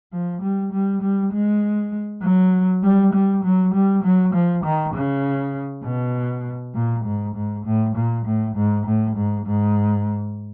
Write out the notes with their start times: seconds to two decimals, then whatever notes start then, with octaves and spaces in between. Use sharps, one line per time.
0.13 F3
0.42 G3
0.73 G3
1.02 G3
1.33 G#3
2.23 F#3
2.83 G3
3.13 G3
3.44 F#3
3.74 G3
4.03 F#3
4.34 F3
4.64 D#3
4.94 C#3
5.85 B2
6.75 A#2
7.05 G#2
7.35 G#2
7.65 A2
7.96 A#2
8.25 A2
8.56 G#2
8.86 A2
9.16 G#2
9.46 G#2